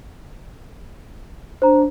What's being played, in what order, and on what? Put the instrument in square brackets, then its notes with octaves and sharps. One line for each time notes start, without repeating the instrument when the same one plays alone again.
[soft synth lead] D4 [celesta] C5 A#5